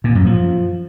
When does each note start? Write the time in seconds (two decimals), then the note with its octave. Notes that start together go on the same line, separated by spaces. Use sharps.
0.04 A#2
0.15 F#2
0.26 F3